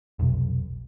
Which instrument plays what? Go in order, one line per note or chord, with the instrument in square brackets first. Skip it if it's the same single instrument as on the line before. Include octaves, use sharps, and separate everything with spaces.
[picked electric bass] F1 B1